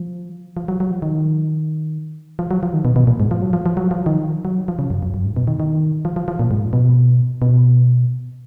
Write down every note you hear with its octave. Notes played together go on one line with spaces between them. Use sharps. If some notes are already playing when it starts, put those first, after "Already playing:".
Already playing: F3
F3
F#3
F#3
F3
D#3
F3
F#3
F3
D#3
B2
B2
A#2
G#2
F3
F#3
F3
F3
F#3
F3
D#3
F#3
F3
C#3
F#2
F#2
F#2
G#2
B2
D#3
D#3
F3
F3
F3
A#2
G#2
B2
B2